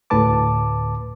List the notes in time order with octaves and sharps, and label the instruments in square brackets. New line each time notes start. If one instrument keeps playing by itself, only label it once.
[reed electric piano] D2 A2 D3 B4 A5 D6